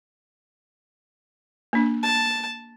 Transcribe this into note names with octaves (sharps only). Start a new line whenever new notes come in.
A#3 D4
A5